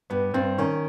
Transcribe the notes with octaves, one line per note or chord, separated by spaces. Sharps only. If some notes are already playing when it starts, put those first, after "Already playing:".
G2 B3
G2 C4
D#3 C#4